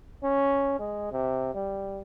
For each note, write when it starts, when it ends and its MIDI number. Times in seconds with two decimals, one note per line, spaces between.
0.23 0.78 61
0.79 1.07 56
1.11 1.51 48
1.54 2.02 55